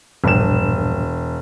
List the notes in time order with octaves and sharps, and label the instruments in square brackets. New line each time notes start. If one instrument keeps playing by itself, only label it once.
[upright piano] E1 E7 [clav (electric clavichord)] A#1 G2